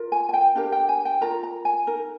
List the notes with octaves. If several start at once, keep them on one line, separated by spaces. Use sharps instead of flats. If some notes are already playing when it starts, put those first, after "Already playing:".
Already playing: F4 A#4
G#5
G#5
G5
D4 G4 A#4 F5
G5
G#5
G5
F4 A#4 A#5
A#5
G#5
D#4 A#4